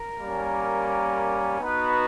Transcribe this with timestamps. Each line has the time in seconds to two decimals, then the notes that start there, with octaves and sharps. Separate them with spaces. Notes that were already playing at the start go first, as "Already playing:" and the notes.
Already playing: A#4
0.18 G3 A#3 C#4
1.60 B3 D#4 F#4 B4